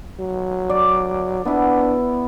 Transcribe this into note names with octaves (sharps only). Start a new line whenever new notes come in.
F#3
D5
B3 D4 E4